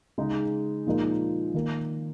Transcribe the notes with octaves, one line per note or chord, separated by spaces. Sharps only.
C#3 G#3 D#4 G#4
A#2 F3 G#3 D#4 A#4
D#3 A#3 D#4 A#4